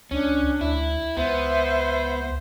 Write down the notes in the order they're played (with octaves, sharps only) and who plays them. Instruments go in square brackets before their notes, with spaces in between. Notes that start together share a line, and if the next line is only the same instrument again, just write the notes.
[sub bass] C#2 [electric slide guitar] C#4 [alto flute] D4
[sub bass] D2 [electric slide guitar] E4
[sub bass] C#2 [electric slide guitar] B3 [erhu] C5 [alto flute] E5